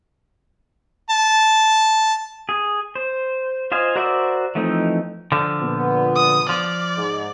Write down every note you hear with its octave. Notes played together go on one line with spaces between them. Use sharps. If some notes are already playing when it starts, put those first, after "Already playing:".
A5
G#4
C5
F4 C5 D#5 F5 G#5
F#4 A#4 C5 D5 E5
E3 F3 A3 C4 D#4
D3 F3
A#2 B3
D#6
F3 D5
G#2